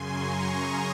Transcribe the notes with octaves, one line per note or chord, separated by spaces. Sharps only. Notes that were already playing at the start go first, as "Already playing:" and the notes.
Already playing: F#2 C#3 G#5 C6
A#5 C#6
C6 D#6